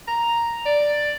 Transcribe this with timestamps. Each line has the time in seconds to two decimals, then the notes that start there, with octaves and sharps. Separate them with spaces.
0.08 A#5
0.65 D5